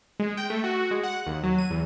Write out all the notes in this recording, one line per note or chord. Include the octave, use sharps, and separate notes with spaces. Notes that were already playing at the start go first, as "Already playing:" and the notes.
G#3
G5
A3
F#4
G#3
F#5
D#2
F#3
D#7
E2